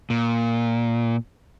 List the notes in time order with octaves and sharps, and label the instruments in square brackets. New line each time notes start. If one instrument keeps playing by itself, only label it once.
[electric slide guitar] A#2